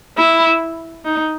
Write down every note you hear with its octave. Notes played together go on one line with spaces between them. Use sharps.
E4
D#4